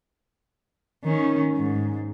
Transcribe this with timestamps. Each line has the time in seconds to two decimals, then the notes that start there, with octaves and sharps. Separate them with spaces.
1.04 D#3 C#4
1.56 G#2